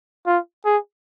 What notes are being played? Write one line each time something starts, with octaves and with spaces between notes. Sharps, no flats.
F4
G#4